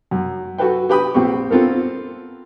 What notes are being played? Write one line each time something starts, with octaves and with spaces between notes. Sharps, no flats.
F#2
F#4 A4 B4 G5
G4 B4 G5 B5 D#6
A#1 C4 G4 C#6
B3 C4 F4 A4 A#4